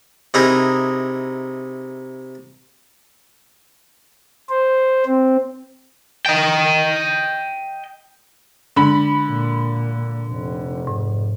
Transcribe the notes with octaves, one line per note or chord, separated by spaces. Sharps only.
C3 D#4 E4 G#4 A#4
C5
C4
D#5 G5
D3 G#3 B5
A#2
F1
G#2